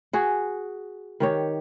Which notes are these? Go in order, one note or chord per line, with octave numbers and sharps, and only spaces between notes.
F#4 G#4
D#3 G4 C#5